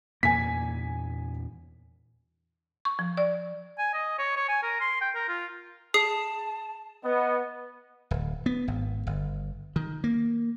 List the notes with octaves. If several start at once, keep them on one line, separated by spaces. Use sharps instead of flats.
E2 A#2 A#3 G#5 B6
C#6
F3
D5
G#5
D#5
C#5
C#5
G#5
A#4
C6
G5
A#4
F4
G#4 A5 D#6 C7
B3 D#5
D1
B3
G#1
G1
D#3
A#3